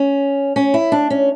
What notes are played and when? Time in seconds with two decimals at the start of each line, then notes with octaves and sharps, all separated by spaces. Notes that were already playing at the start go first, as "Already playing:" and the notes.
Already playing: C#4
0.56 C#4
0.74 E4
0.92 D4
1.10 C#4